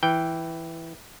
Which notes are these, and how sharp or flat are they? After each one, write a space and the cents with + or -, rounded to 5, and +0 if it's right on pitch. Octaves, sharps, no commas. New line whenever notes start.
E3 +0 G5 +0